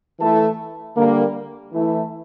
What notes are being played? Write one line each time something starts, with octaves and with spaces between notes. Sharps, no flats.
E3 A3 E4 A4
D3 G3 A#3
E3 A3 E4